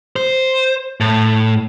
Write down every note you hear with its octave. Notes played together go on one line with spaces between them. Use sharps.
C5
A2